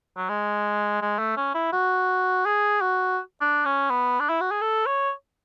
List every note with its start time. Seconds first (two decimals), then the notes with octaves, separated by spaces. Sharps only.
0.17 F#3
0.29 G#3
1.02 G#3
1.19 A3
1.37 C#4
1.55 E4
1.73 F#4
2.46 G#4
2.81 F#4
3.41 D4
3.65 C#4
3.90 B3
4.20 D4
4.29 E4
4.41 F#4
4.51 G#4
4.61 A4
4.86 C#5